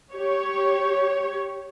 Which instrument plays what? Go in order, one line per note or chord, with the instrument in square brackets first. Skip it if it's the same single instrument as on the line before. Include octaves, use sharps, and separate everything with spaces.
[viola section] G4 C#5